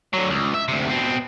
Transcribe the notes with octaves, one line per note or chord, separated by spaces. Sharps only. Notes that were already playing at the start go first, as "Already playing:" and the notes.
D3 F#3
C#2
E5
D2 C3
B2 C4